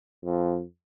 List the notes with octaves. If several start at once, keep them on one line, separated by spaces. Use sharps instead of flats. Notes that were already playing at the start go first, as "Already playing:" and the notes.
F2